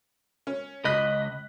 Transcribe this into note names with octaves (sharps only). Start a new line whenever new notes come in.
C#4
C#2 D#5 B5 F#6 B6